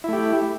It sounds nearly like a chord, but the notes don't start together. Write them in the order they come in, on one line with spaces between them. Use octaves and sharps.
E4 A3 G4